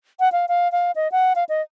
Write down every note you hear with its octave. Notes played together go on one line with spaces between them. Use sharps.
F#5
F5
F5
F5
D#5
F#5
F5
D#5